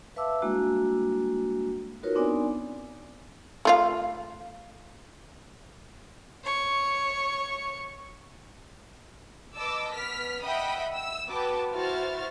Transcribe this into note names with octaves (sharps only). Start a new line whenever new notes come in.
B4 E5 F5 A5 D6 E6
G3 G#3 A#3 D4 E4 F#4
D#4 F4 F#4 A#4 B4 C#5
B3 C4 D4 D#4 D5 G#5
A3 F4 F5
C#5 C#6
B4 D#5 A5 D6 E6
B3 F6 B6
D#5 E5 F#5 G5 B5 D#6
E6
B3 F#4 B4 G5 A5 D6
E4 F#4 C5 F6 A6